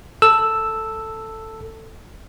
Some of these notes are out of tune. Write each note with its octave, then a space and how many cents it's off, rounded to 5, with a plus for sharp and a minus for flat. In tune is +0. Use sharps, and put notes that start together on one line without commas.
A4 +10 E6 +0